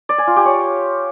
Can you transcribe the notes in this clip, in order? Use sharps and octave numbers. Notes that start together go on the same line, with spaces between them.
D5
G#5
F4
G4
C#5